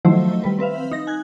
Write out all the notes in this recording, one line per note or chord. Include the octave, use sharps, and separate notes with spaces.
D#3 F3 F#3 A3 E4 C5
G3 B4
C4 B4 E5 F5
D#4 A#6
G#5 F#6 G#6